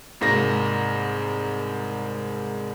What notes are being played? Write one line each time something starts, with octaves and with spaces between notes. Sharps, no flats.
C2 G#2 A#3 A#6